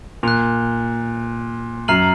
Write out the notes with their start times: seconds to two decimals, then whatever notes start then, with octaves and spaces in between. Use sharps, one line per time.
0.23 A#2 F#6 C#7 F7
1.88 F#2 A#5 F6 C7 D#7 F#7